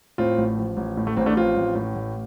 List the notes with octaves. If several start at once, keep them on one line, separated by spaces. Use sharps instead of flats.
A2 C4 F4
A1
F3
A1
A2
A3
A1 C4
A3 D4
F3 C4 F4
A1
A2
A1